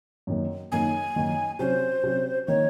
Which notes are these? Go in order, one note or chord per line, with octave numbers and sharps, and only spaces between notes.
F#2 D#3 A#3
F#2 D#3 A#3 D#4 G#5
F#2 D#3 A#3 D#4
C3 F#3 C#4 C5
C3 F#3 C#4
D#3 A#3 C#5